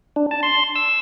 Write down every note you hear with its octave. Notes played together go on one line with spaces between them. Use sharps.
D4
A5
C6
E6